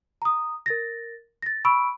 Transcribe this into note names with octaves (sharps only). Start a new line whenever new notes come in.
A#5 D#6
A#4 A6 A#6
A6 A#6
B5 C#6 E6 D7